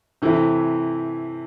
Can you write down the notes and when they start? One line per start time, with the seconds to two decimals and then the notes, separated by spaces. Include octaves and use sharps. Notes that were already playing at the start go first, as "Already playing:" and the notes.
0.22 C3 E3 A3 E4 G4